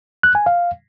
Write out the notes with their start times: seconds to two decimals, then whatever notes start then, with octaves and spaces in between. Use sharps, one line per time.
0.23 F#6
0.35 G#5
0.46 F5